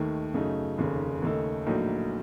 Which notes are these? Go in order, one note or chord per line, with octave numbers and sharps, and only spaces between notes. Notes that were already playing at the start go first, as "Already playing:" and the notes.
Already playing: D#2 D#3 A3
F#2 C#3 A3 D#4
F1 D#2 C#3
D#2 C#3 A3 D#4 A4
A#1 A2 F#3 A#3 D#4